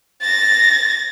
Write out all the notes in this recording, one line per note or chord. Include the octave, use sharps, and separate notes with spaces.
A6 A#6